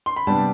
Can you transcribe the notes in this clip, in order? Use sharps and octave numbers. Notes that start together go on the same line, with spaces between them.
C6
B5
C3 G3 B3 D4 A5